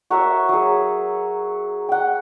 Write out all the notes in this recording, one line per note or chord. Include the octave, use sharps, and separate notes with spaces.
F#4 A#4 C#5 E5
F#3 G#4
F#5 G5